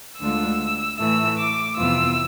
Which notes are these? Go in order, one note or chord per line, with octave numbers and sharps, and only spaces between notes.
D2 D3 G#3 D4 F4 E6
A2 E3 A3 E6
D6
F2 C3 E3 B3 F4 E6